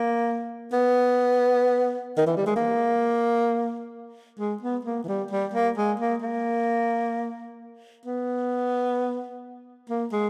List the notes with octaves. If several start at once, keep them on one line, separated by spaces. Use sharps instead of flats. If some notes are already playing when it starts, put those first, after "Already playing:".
Already playing: A#3
B3
D#3
E3
G3
G#3
A#3
G#3
B3
A#3
E3
G3
G3
A#3
G#3
A#3
A#3
B3
A#3
G#3